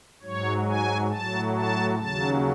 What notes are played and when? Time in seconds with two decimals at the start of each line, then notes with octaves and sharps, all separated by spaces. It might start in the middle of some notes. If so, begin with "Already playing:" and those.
0.22 G#2 F#3 C#5
0.67 G#5
1.11 A2 F#3 A5
1.56 A5
1.99 D#2 C#3 F#3 A5